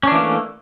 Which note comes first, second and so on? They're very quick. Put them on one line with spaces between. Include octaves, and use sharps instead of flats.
C#4 D4 E3 A#3 A3